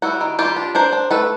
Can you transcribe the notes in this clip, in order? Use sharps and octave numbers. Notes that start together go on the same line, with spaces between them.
G3 E4 F#4
D#3
G3 F4 G4
D4
D4 A#4 C5
D4
A3 A4 B4